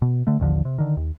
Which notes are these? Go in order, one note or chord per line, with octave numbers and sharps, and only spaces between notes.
B2
D3 A3
A1 D#2 D3 F3
C3
D3 D#3
D#2